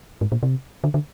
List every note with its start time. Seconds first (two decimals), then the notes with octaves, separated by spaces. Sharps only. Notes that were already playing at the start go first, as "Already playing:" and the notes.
0.21 G#2
0.32 A#2
0.43 C3
0.84 D3
0.94 D3